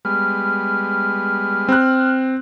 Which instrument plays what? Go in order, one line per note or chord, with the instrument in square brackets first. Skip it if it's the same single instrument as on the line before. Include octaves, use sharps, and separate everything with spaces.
[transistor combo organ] G3 G#3 B3 [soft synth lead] F6
[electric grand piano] C4 F#6